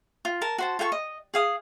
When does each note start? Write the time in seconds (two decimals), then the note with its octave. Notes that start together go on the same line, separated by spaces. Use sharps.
0.25 F4
0.41 A#4 A5
0.58 F#4 C5 A5
0.79 F4 A4 G5 C#6
0.92 D#5
1.34 G#4 F5 D#6